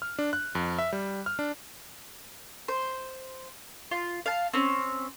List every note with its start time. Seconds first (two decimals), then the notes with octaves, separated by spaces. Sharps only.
0.02 F6
0.19 D4
0.33 F#6
0.55 F2
0.78 E5
0.93 G3
1.26 F6
1.39 D4
2.68 C5
3.91 F4
4.26 F5 A5
4.54 C4 C#4